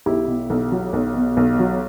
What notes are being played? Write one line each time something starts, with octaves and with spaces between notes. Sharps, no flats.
B1 E4 G4
B2
B1
F#3
B1
B2
B1
F#3